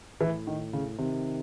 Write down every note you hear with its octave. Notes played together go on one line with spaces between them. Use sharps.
A2 E3
D#3
C#3
C3 D#3